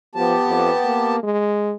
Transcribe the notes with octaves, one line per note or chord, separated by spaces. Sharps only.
F3 B3 G4 A5
F2
A#3
G#3